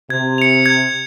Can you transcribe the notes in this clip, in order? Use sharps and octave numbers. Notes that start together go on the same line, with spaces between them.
C3 G#6
C#7 F7
G#6